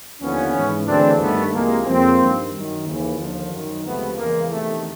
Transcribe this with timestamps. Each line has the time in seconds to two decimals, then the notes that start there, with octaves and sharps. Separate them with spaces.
0.21 D#2 D3 F3 B3 C#4
0.54 G#2 E3
0.87 D2 C#3 E3 C4 D4
1.20 G2 D#3 A3 B3
1.53 C2 C3 F3 G#3 A#3
1.86 F2 C#3 F3 A#3 C4
2.19 G2 D#3
2.53 F#2 D#3
2.85 D#2 C#3 E3
3.19 D#2 D3 F3
3.51 F#2 D#3
3.84 C#2 C3 F3 A3 B3
4.17 E2 C#3 E3 G#3 A#3
4.50 E2 C3 D#3 A3